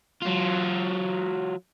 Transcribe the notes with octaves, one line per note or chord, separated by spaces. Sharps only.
F#3 F4